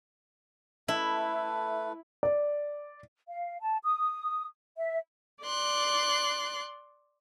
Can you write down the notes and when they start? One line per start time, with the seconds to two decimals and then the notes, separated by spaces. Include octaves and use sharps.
0.88 A3 E4 A4 B4
2.23 D5
3.28 F5
3.60 A5
3.83 D#6
4.77 E5
5.44 D5 C6 F#6